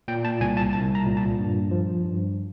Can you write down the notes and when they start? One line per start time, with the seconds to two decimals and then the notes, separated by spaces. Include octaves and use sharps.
0.08 A#2 G5
0.25 A5
0.41 C2 G#5
0.57 A5
0.73 C2 A5
0.95 A#5
1.06 A#2
1.17 A5
1.39 G2
1.71 F3
2.04 G2